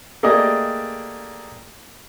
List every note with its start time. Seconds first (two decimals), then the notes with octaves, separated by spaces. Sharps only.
0.23 A3 A#3 G4 G#4 D5 D#5